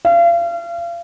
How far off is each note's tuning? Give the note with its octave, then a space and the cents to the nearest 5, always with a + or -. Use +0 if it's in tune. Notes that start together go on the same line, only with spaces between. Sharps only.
F5 -35